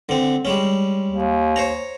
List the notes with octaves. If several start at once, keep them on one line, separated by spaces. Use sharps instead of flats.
D3 C4
G3 G#3 C#4
D#2
C5 C#5 A#5